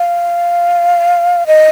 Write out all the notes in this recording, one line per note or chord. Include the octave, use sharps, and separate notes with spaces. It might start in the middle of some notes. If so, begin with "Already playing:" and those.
Already playing: F5
D#5